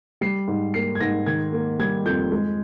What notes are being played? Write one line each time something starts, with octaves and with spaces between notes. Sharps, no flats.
G3 C7
G#2
A#3 C7
G#6
G#2 A#6
D#3 G#6
A#3
G3 G#6
F2 G6
G#3